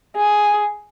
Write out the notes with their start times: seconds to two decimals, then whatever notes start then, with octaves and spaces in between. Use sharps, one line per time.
0.16 G#4